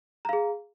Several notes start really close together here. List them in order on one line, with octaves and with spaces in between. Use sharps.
A#5 F5 G#4